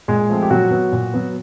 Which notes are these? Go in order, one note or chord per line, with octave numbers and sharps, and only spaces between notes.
A#2 G#3 G#4
F3 A3 C4
G4
A#2 F#3 F#4
F#3 B3
A#2
F#3 B3